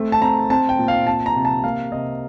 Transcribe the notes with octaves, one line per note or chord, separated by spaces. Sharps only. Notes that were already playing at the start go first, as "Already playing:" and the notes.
Already playing: A3 C4
A5
C4 A#5
C4 A5
G5
A#2
F5
C4 A5
A#5
C3
A5
A#3 F5
C3 D#5